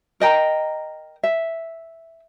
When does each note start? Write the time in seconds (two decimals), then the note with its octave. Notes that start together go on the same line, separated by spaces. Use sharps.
0.20 A#4 D#5 G5 A#5
1.23 E5